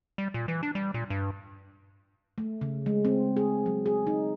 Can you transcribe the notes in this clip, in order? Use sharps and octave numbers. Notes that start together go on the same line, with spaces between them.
G3
A#2
E3
D4
G3
A#2
G2
A3
C#3
G#3
C4
G#4
F#3
G#4
D#4